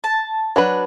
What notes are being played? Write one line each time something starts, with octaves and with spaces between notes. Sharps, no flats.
A5
F#3 D4 B4